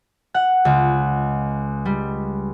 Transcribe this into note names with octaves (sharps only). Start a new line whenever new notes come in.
F#5
C#2
G3